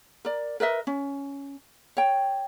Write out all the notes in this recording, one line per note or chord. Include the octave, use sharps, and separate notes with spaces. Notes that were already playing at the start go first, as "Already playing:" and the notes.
A#4 D5
A#4 B4 D#5 E5
C#4
C#5 G5